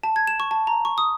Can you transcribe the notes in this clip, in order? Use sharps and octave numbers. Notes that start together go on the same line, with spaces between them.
A5
G#6
E7
C#6
A5
A#5
C#6
D#6